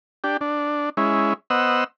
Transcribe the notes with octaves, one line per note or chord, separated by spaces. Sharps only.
D4 G4
D4
G#3 C#4 E4
B3 C5 D#5 F#5 E6